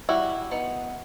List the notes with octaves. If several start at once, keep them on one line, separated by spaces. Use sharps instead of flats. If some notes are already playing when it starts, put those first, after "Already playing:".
G3 E4 F#4
B3 D#4